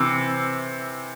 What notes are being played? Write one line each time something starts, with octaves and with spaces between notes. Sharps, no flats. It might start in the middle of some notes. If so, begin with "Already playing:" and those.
Already playing: C3 E3